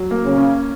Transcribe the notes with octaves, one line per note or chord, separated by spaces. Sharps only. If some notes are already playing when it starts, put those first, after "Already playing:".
Already playing: F#3
A#3
C#3
C#4